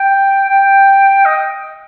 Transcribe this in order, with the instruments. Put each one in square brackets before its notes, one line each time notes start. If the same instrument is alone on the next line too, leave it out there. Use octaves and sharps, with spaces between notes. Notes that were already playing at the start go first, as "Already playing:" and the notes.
Already playing: [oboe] G5
G5
D#5